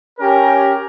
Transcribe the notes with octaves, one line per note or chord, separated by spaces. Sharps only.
C#4 G4 A#4